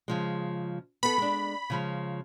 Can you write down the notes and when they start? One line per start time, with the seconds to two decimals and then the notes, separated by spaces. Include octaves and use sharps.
0.08 C#3 F3 G#3
1.03 B3 A4 B5
1.18 G#3 D4
1.70 C#3 F3 G#3